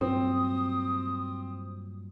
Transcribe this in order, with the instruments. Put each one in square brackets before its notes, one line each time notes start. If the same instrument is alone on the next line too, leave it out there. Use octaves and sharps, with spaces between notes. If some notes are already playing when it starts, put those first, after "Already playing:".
[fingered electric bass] G2 A#2 F#3 [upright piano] C4 [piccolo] D#6